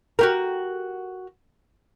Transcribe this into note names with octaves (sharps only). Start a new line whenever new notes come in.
F#4 G4 A#4